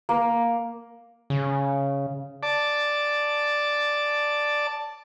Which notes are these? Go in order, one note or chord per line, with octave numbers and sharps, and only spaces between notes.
A#3
C#3
D5 A5